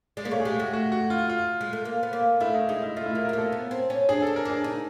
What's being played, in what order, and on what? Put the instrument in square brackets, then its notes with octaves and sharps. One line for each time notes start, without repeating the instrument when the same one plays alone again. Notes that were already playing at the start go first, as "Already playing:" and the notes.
[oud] G#3 [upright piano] D5
[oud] A#3
[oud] A3 [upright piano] C#5
[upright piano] G#4
[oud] G#3 [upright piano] G4
[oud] A3 [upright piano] F#4
[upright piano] F#4
F#4
F4
F4
[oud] G#3
A3
A#3
B3
A#3
[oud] A3 [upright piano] E4
[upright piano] D#4
[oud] G#3 [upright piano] D#4
[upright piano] E4
[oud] A3 [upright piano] F4
[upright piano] E4
[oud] A#3 [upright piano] F4
[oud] A3 [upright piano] A#4
[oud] A#3 [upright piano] A4
[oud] B3
C4
C#4
[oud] D4 [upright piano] G#4
[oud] D4 [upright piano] A4
[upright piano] A#4
[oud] D4 [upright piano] G#4
[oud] D#4